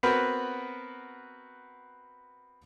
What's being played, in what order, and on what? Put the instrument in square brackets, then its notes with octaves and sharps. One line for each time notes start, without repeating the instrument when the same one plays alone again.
[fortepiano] B3 C4 F#4 A#4 B4